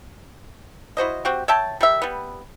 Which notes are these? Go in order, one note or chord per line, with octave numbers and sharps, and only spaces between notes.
E4 F#4 C5 D#5
C4 F#4 G4
C#5 E5 G5 A5
G3 A#4 E5
G3 B3